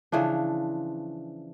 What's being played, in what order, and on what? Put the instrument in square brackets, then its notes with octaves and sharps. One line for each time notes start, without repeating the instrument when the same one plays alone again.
[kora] C#3 E3 F3 D4